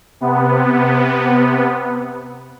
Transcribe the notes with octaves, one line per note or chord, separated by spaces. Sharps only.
C3 B3